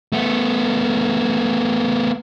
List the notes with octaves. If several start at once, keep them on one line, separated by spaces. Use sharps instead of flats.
A3 B3